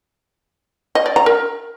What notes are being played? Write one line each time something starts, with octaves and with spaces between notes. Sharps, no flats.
D#5
D5
A#5
A#4